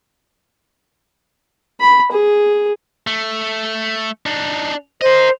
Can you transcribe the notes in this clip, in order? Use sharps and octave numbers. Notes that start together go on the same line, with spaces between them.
B5
G#4
A3
D4 D#4
A#4 C5 D#5